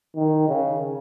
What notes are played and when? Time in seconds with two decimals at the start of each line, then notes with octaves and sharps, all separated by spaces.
0.16 D#3
0.49 C#3